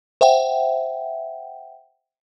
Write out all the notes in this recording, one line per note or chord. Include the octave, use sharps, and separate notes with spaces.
C5 E5 F#5 G5